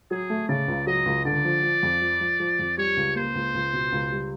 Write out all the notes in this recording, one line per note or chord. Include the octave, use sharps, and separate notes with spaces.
F#3 G#4
A3
C#3 D5
C#2
F#3 D#5
C#2
D3 D5
F3
F3
F2
F3
F3
F3
F2
G3 C#5
C#2
A#3 C5
C#2
C#2
B2
C#2
G3